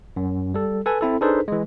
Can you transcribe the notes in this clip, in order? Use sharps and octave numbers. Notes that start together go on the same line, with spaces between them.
F#2
G3 A4
A4 B4 G#5
C4 E4 A4
D4 D#4 G#4 A4 B4 C5
E3 G#3